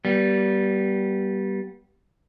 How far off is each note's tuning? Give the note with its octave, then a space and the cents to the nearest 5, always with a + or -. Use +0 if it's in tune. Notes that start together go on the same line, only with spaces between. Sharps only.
G3 -15 B3 -30